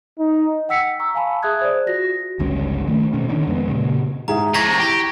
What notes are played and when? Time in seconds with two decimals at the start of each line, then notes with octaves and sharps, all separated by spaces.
0.19 D#4
0.69 F#5 G5 E6 B6 C#7
1.00 A#5 C#6 E6
1.15 F5 G#5 A5 B5
1.43 G#4 E5 D#6 F#6 G#6
1.61 C5 D5
1.86 F4 F#4 A#6
2.39 G1 C#2 G2 C#4
2.87 D#3 A3
3.13 B2 C#4
3.28 D3 D#3 C#4 D4
3.47 F2 G#3 B3
3.68 A#2 C#3
4.28 G#2 G#4 E5 A#5
4.54 C3 F3 A#5 C#6 G#6 A#6
4.80 E3 G4